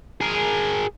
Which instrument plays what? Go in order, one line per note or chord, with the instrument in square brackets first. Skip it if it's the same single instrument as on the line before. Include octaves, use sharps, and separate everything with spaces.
[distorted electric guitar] G#4 A#4